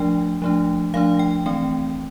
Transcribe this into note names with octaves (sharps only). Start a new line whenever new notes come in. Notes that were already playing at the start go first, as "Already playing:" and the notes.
Already playing: F3 A3 D4 G5
F3 A3 D4
F3 A3 D4 F5
G5
E3 A3 C4 G5